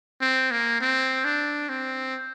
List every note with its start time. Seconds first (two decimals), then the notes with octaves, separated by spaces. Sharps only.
0.21 C4
0.51 A#3
0.80 C4
1.25 D4
1.69 C4